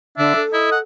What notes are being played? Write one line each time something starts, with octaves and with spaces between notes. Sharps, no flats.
D3 D4 E5
A4
E4 D#5
F#5